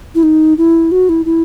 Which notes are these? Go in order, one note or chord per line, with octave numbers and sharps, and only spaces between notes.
E4
D#4
E4
F#4
E4
E4